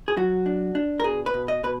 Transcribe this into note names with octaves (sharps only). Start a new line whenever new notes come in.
G#4
F#3 F#4
D4
D4
A#4
B2 G#4
B4
B2
D#5
B2 B4